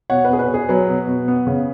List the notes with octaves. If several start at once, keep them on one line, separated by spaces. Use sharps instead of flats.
B2 C#5 F#5
B4
B2 G#4
B4
B2
G#4
F#3 B4
B2
B2
B3
C#3